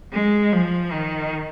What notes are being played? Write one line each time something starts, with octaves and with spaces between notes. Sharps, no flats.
G#3
F3
D#3